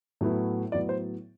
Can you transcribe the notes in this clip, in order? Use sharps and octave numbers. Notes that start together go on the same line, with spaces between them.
A2 F#3 B3 E4
A2 F#3 B3 E4 D5
C5